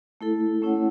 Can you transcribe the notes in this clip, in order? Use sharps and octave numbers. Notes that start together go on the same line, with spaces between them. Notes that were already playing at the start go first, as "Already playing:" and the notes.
A3 E4 A4
A3 C#4 E4 C#5 F#5